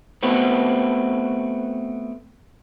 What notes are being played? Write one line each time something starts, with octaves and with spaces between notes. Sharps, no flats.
A3 B3 C4 F#4